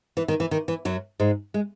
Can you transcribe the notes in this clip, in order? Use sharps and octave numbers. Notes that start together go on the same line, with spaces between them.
E3
D#3
E3
D#3
E3
F#2 F#3
G#2 G#3
G#3